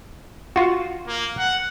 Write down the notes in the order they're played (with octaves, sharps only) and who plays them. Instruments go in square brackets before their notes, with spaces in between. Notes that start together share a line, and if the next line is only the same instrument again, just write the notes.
[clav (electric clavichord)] F4 F#4
[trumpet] A#3
F#5